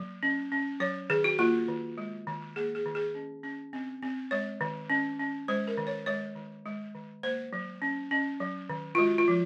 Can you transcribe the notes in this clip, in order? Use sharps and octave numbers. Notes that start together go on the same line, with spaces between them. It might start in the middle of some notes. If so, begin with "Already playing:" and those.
Already playing: F#3 A#3
C#4
C#4
F#3 C#5
D#3 G#4
F#4
A#3 F4
D#3
G#3
D#3
A#3 G#4
G#4
D#3
G#4
C#4
C#4
C4
C4
G#3 C#5
D#3
C#4
C#4
G#3 C5
A#4
D#3
C#5
G#3 C#5
D#3
G#3
D#3
A#3 C5
F#3
C#4
C#4
F#3
D#3
F4
G#3 F#4
F4
F3